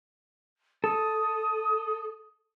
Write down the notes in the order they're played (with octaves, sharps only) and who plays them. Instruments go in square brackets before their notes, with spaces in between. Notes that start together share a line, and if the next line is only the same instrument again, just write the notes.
[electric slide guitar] A4 [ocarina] D#6